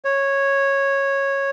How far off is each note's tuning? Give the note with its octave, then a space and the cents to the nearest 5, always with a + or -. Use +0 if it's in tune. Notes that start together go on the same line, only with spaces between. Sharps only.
C#5 -10